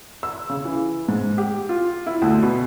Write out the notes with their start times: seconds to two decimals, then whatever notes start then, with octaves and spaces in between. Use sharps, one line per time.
0.23 E6
0.49 C#3
0.65 E3
1.08 G#2
1.38 G4
1.69 F4
2.06 E4
2.22 D2
2.43 B2